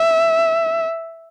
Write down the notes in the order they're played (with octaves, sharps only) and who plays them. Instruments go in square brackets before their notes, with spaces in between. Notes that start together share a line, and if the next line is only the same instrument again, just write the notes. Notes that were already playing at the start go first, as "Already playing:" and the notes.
Already playing: [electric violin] E5